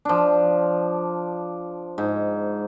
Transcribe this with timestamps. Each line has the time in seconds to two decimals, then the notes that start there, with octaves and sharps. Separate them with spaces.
0.05 F3 D4
1.98 G#2